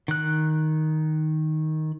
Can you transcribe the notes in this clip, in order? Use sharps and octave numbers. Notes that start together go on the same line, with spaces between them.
D#3 F#6